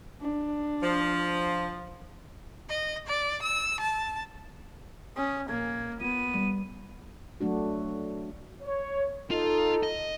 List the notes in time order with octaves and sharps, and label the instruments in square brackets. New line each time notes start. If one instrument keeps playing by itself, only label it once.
[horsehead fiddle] D4
[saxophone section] F3
[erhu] D#5
D5
E6
A5
[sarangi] C#4 [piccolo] D#6
[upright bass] A#1 [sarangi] A#3 [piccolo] G#6
[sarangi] B3 [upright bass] F4 [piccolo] D#7
[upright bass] G3
[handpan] F#3 A3 D4 F#4
[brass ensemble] C#5
[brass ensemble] D#4 A4 [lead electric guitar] F4
[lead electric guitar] D#5